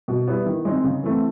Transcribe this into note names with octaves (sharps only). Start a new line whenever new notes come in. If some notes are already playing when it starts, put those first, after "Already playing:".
B2
G3 B3 E4
D#3
G#3 C4 D#4
C#3
E3 A3 C4